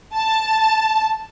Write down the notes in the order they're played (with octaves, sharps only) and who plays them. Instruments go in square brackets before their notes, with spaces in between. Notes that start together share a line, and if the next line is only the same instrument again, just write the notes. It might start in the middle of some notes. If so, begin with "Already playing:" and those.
[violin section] A5